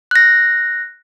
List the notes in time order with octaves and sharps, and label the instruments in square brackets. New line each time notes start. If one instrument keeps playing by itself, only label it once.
[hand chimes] F#6 A#6